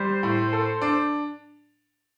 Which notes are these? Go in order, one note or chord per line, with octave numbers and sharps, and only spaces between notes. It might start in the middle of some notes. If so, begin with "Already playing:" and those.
Already playing: G3 C5
A2
A4
D4